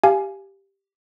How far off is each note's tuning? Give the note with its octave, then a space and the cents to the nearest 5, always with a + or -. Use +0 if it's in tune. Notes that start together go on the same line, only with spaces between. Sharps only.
G4 +0 F5 -10 G#5 +10